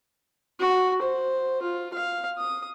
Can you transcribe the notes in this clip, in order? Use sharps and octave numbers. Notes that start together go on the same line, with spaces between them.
F#4
C5
F4
F5
D#6